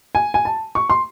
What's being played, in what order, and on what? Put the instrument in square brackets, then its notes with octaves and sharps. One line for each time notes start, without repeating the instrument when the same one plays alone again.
[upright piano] G#5
G#5
A5
C#6
C6